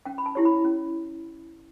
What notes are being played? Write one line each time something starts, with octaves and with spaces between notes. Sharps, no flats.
C#4 G5
B5
A5
E4 G4 C#5
B5
C#4